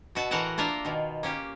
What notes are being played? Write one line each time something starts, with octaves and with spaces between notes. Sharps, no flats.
B2 F#4 E5 A5
A2 E3 F#4 A#4 F#5 A5
A#3 D4 F4 A#4 E5
B2 D#3
A#3 C#4 G4